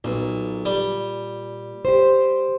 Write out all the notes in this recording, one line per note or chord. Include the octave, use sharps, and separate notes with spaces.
B1 A#2
G3
G4 C5